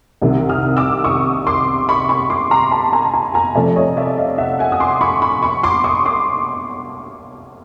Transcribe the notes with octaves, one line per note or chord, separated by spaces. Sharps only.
C2 C3 D#3
D#6 F6
D6 E6
C#6 D#6
C6 D6
B5 C#6
B5 C#6
C6 D6
A#5 C6
A5 B5
G#5 A#5
G#5 A#5
G#5 A#5
C3 F3 A3 D5 E5
C#5 D#5
D5 E5
D#5 F5
E5 F#5
F#5 G#5
D#6
C6 D6
B5 C#6
B5 C#6
B5 C#6
C6 D6
C#6 D#6
C6 D6